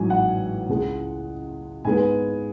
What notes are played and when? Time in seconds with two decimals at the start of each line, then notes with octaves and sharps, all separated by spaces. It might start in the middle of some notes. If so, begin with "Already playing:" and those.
Already playing: A1 G#2 F#3 G#5
0.10 F#5
0.69 C#2 C#3 G#3
1.85 G#2 G#3 B3 G#5